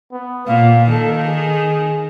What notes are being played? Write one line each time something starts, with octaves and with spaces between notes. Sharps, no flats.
B3
A#2 F5
D#3 A4
G#4